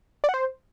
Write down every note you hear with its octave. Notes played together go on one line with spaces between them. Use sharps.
D5
F#5
C5